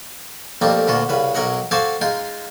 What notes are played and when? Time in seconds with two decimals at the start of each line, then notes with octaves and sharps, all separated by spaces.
0.61 F2 G3 A3 A#3 C4 D#4
0.87 D2 A#2 D3 F4 F#4
1.09 C2 C#3 B4
1.35 B1 F#3 A#4 D#5 F#5
1.71 F#4 A4 C5 F5 G#5 D6
2.01 G#3 D#4 F4 G5 C6